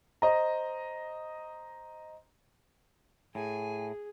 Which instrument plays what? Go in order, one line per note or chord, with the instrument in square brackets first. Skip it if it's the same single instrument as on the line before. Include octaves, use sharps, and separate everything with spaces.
[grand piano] C5 D#5 A#5
[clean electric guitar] A2 [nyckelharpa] G#4 [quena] G#5